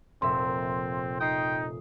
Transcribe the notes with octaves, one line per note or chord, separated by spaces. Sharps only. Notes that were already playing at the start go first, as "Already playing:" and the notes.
F1 A#2 C4 E5 C6
D#4 G5 D#6 C7